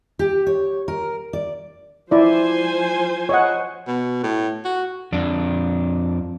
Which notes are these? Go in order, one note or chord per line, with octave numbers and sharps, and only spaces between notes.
G4
C#5
A#4
D5
F3 E4 C5 D5 G#5
C#5 D#5 F#5
B2
A2
F#4
F2 D4